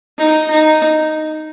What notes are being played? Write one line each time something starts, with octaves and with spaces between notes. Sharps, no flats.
D#4
D#4